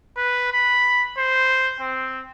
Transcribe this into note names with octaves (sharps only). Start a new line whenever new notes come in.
B4
B5
C5
C4